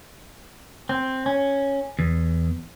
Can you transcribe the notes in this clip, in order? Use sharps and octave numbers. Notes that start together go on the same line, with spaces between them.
C4
C#4
E2